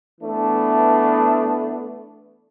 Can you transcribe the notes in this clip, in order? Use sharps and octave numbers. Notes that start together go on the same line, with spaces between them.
E3 A3 B3 D4